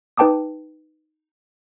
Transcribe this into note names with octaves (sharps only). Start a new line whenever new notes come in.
D#4 B4 G5 A5 D6 D#6